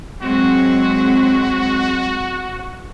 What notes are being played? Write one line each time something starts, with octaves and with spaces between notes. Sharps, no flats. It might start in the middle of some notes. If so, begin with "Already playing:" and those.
F#3 G#3 C4 F#4